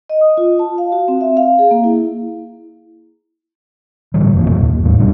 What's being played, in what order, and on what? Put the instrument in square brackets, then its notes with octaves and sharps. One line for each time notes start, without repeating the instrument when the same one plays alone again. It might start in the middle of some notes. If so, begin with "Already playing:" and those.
[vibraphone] D#5
D#6
F4
A5
F5
F#4
C4
E5
F5
G#4
A#3
E4
[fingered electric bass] A2 D3 E3 G3
F#1 F2 A#3
G2 A#2 F#3
D#2
E2 A2
D#1 C#3 G3 D4